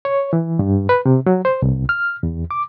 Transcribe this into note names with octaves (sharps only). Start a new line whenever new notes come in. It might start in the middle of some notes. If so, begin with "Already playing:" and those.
C#5
E3
G2
B4
C3
F#3
C5
C2
F6
E2
D6